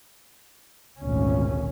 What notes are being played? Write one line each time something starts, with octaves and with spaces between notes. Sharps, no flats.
G#1 D2 A#2 C#4